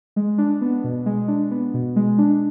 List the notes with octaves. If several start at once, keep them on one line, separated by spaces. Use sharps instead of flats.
G#3
D4
B3
B2
G#3
D4
B3
B2
G#3
D4